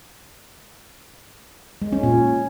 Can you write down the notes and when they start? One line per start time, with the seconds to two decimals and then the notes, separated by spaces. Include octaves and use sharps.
1.82 G#3
1.92 C#4
2.03 A#2